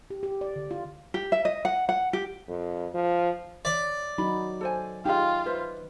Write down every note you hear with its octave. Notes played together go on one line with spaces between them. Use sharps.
G4
G4
D5
D3
F4
G4
E5
D#5
F#5
F#5
G4
F2
F3
C#5 D5 E5
F#3 D#4 F#4 B5
A4 C5 G#5
D#4 F4 G4 G#4 F5
B4 C5 E5